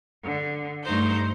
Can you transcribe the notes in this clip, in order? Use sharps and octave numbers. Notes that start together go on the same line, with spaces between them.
D3
G2 A3 D#4 C5 G6